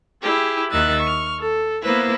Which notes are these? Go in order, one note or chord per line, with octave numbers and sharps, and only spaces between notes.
E4 G4 G#4
D#2 D#3 E5 F#6 A6
C#6 F6
A4
A#3 B3 E4 B4 C5